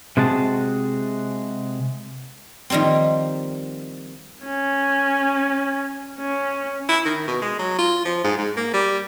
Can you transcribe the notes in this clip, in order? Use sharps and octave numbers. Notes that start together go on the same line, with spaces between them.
C3 G#3 F#4 G#4 A5
D#3 F3 G3 A#3 C4
C#4
C#4
E4
D#3
B2
G#3
F#3
F4
F3
G#2
G#2
A#3
G3